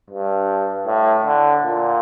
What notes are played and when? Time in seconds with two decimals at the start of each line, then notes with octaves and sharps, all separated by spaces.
0.10 G2
0.87 A2
1.26 D3
1.64 A#2